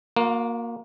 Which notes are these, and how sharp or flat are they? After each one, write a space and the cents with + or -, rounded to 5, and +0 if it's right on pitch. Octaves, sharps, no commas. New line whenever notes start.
A#3 +0 F#4 -45